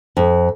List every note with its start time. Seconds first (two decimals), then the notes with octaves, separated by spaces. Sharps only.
0.17 F2